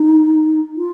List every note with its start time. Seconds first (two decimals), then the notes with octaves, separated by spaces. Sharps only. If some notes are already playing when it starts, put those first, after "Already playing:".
Already playing: D#4
0.76 F4